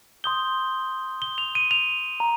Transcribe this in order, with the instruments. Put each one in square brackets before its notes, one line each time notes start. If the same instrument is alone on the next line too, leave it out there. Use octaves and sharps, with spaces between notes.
[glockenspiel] C6 D#6 G6 G7
G7
F7
D#7
F7
A#5